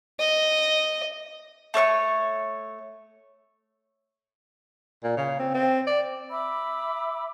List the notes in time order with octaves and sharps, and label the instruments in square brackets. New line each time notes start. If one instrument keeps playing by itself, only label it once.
[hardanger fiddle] D#5
[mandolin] A3 C#5 F5 C#6
[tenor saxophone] A#2
C#3
C4
C4
D5
[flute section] E5 B5 D6 E6